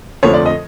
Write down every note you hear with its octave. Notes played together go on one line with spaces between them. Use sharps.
F2 D3 F3 A3 C4 C#5
D5
D#5